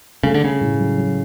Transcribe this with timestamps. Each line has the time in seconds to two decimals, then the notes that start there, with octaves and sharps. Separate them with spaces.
0.23 C#3 A3
0.34 D3
0.43 C#3 A3
0.61 A2
0.79 F#3
0.97 F#3